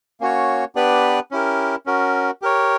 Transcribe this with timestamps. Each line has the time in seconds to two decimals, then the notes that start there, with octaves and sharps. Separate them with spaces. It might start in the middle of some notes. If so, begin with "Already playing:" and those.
0.20 A#3 C#4 F#4 C#5
0.75 B3 D4 G4 B4 D5
1.31 C#4 E4 G4 A#4
1.86 C#4 F#4 A#4
2.42 G4 A#4 C#5